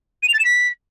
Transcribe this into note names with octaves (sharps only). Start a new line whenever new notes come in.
D#7
F7
A6
E7
B6